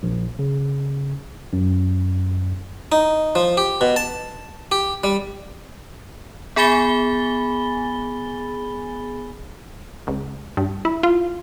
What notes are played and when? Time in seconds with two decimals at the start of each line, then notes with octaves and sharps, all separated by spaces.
0.03 A#1
0.39 C#3
1.53 F#2
2.92 D#4
3.35 F3
3.57 G4
3.81 B2
3.96 A5
4.72 G4
5.04 G3
6.56 B3 G#4 G#5 B5 A6 G7
10.07 C#2
10.57 G2
10.85 E4
11.03 F4